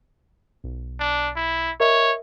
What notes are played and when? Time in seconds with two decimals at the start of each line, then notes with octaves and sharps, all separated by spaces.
0.64 B1
1.00 D4
1.36 E4
1.80 A#4 C#5 D#5 E5